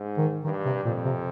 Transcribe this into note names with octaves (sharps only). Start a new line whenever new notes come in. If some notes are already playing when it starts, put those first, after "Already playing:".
Already playing: G#2
D#3
G2 D#3
C3
F2 A#2
C3